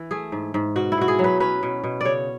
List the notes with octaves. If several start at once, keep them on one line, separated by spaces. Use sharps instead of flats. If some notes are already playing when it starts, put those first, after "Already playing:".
Already playing: E3
A3 G#4
G#2
G#2
B2 F#4
E4
B2 F#4
G#4
F#3
B4
C#4 B4
B2
B2
C#3 C#5 D5